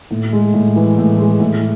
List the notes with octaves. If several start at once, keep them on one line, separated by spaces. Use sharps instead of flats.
A2
G#3
A2
E3
A2
G#3
A2